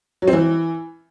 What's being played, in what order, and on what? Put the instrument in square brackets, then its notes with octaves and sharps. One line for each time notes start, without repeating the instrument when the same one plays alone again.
[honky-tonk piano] F#3
C4
E3